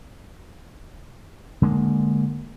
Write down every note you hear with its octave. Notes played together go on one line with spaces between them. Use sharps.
D3 G#3 A#3